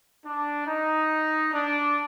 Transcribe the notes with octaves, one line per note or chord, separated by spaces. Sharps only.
D4
D#4
D4